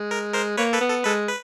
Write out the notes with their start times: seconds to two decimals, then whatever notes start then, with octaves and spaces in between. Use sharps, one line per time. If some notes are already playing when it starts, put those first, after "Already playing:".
Already playing: G#3
0.11 A#4
0.34 A#4 C5
0.57 A#3 B4 C#5
0.73 A4 B4
0.81 B3
0.88 A4
1.04 G#3 A4 B4
1.28 B4